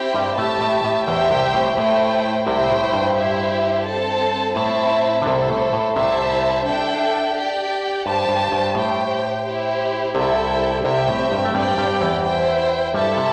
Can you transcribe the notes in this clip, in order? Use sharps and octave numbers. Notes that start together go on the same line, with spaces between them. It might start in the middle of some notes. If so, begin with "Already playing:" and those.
Already playing: C4 E4 G4 C5 G5
G2 G3
A2 A3 G4 E5 A5
A2
A2
E2 E3 G4 C5 E5 G5
C2 C3
A2
A2 A3 E4 C5 G5
C2 C3 E4 C5 G5
A2
G2
E4 G4 C5 E5
C4 A4 C5 A5
A2 C4 E4 C5 E5 A5
D3
C2 C3 E4 A4 C5
A2
A2
C2 C3 E4 C5 E5 A5
D4 A4 E5 G5
G4 D5 G5
G2 G4 C5 A5
G2
G2
A2 G4 C5 G5
E4 G4 C5
C2 C3 E4 A4 E5 G5
C2 C3 C4 G4 E5 G5
A2
G2
A3
G2 G3 C4 G4 D5 G5
G2 G3
E2 E3
E4 C5 G5
G2 G3 E4 A4 E5 A5
C3